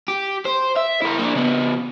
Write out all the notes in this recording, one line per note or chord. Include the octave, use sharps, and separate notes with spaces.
G4
C5
E5
E4 A#4
A#3 D4
C#3 B3